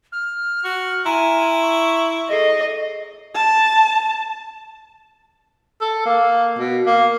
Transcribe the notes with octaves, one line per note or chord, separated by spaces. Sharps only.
F6
F#4
E4 G#5 A#5 C6
C#6
G#4 A4 D#5 C7
A5
A4
A#3
B2
A#3